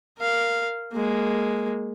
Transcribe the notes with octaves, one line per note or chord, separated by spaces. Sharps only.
A#4 F5
G#3 A#3